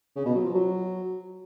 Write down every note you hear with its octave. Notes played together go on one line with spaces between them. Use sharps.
C#3
B2
F#3
F3
F#3